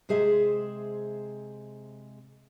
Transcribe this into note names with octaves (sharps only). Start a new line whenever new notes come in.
C3 G#3 G#4 C5 E5